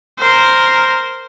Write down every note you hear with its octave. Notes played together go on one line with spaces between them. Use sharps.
A#4 C5